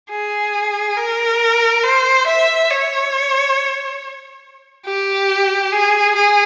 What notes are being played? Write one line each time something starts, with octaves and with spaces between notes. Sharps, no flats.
G#4
A#4
C5
E5
C#5
G4
G#4
G#4